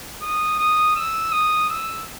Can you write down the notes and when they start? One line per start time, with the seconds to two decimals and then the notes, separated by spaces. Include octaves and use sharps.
0.22 D#6
0.59 D#6
0.96 E6
1.32 D#6
1.69 E6